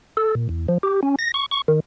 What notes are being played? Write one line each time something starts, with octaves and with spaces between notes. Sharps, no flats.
A4
A#2
E2
F3
G4
C#4
A#6
C#6
C#6
D#3